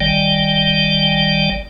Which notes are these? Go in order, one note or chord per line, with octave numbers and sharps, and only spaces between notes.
G#1 D#3 G3 D5 G5